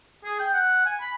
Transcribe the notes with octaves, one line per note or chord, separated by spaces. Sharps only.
G#4
G5
F#5
G#5
B5